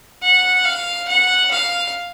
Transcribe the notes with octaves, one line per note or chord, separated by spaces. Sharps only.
F#5
F5
F#5
F5